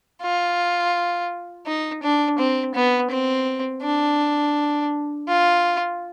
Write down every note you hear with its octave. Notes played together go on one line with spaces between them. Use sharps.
F4
D#4
D4
C4
B3
C4
D4
F4